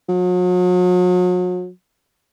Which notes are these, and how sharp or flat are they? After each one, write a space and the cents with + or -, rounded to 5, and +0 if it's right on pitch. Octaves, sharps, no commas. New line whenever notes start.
F#3 -40